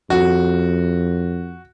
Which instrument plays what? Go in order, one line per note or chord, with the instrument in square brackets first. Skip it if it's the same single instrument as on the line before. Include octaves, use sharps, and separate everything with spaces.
[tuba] F2 [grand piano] F#4